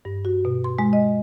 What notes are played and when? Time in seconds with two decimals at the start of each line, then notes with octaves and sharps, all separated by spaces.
0.05 G2
0.25 F#4
0.45 B2
0.64 C6
0.79 G#3
0.93 D#5